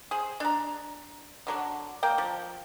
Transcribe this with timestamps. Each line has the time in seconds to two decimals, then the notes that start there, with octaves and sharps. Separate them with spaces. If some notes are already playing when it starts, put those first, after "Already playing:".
0.11 G#4 C5
0.40 D4 A#5
1.47 D3 F#3 D4
2.03 A#3 G5
2.18 F3